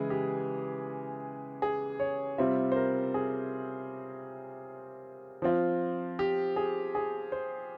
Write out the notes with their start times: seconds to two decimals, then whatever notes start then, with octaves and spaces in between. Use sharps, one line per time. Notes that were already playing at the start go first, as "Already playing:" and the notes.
Already playing: C#3 E3 G#3 E4 G#4
0.10 G4
1.62 G#4
2.00 C#5
2.38 C3 G3 C4 F4 E5
2.72 C5
2.76 A#4
3.14 G#4
5.42 F3 C4 F4
6.19 G4
6.56 G#4
6.95 G#4
7.32 C5